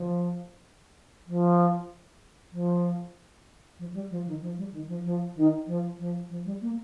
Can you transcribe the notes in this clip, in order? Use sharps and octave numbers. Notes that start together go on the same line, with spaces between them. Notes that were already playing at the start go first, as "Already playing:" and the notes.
Already playing: F3
F3
F3
F3
G3
F3
D#3
F3
G3
D#3
F3
F3
D#3
F3
F3
F3
G3
A#3